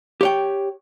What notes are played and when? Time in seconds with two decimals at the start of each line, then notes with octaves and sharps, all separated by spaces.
0.21 G4 C#5 G5